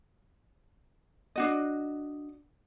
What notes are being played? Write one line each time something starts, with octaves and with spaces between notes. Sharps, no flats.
D4 F#4 D#5